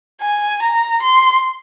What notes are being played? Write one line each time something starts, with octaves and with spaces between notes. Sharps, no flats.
G#5
A#5
C6